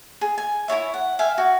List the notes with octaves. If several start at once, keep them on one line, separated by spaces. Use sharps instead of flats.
G#4
G#5
E4 F#4 C#5 E5
F#5
E5 F5 G5 G#5
F#4